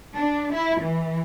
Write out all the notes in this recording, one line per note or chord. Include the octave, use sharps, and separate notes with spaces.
D4
E4
E3